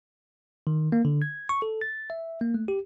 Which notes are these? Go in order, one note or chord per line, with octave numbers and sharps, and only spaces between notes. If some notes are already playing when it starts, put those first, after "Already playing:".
D#3
A#3
D3
G#6
C#6
A4
A6
E5
A#3
A3
G4